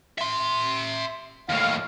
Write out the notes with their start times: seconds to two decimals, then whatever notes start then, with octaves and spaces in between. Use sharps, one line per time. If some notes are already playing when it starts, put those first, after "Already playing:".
0.18 E5 C6
1.50 D#2 A2 F5